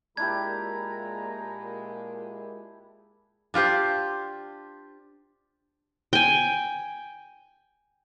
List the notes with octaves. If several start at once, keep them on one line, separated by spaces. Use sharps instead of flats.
A#2 G#3 D4 E4 G4 A#5 G#6
D4 F4 G4 C5
G5 G#5